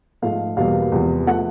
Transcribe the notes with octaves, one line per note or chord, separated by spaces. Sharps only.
G#2 F3 A3 F5
E2 B2 G3 A#3 F5
E2 C3 F3 G#3
F3 A3 F#5